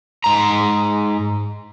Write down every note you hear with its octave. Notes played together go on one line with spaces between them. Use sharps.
G#2 A#5